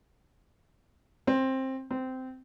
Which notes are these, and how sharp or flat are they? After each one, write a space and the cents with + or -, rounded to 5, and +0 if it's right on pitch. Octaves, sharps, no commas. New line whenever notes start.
C4 +15
C4 -15